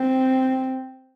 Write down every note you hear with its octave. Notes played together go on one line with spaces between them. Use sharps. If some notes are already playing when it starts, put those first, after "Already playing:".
Already playing: C4